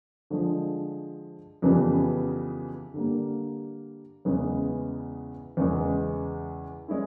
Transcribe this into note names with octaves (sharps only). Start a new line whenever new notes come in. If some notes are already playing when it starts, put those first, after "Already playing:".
D3 F3 G#3
F2 C#3 E3 G3 B3
D3 G3 A#3
E2 C#3 E3 G#3 B3
E2 C#3 E3 G#3
G#3 C#4 E4